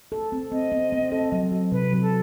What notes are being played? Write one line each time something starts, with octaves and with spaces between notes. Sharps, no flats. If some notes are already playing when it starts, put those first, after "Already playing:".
A4
C4
C4 D#5
C4
C4
A4
F#3
F#3
C3 B4
F#3
A4